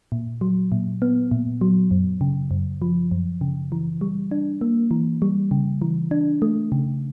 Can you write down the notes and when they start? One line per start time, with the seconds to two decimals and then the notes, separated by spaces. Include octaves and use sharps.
0.12 A#2
0.41 F#3
0.72 A#2
1.02 B3
1.31 A#2
1.61 F#3
1.91 F#2
2.21 C#3
2.51 F#2
2.82 F3
3.11 F#2
3.41 C#3
3.72 E3
4.01 G3
4.31 D4
4.61 A#3
4.91 E3
5.22 G3
5.51 C#3
5.82 E3
6.11 D4
6.42 A3
6.72 C#3